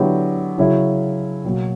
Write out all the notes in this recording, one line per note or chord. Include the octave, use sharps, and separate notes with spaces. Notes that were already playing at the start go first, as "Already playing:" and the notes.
Already playing: D3 F#3 B3 E4 G4
C#3 F#3 C#4 E4
B2 F#3 A#3